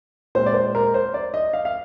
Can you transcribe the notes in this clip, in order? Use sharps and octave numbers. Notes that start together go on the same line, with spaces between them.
A#2 G#3 C4 C5
D5
C5
A#4
C5
D5
D#5
F5
F5